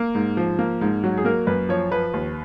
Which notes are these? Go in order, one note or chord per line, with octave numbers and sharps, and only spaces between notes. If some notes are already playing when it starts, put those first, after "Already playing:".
Already playing: A#3
G#2
F3
A#3
G#2
F#3
G#4
A#3 A#4
F#2 B4
F3 C#5
F3 B4
D#2